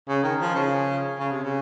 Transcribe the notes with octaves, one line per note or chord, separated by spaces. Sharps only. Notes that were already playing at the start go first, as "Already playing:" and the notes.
C#3
D#3
F3
C#3
C#3
C3
C#3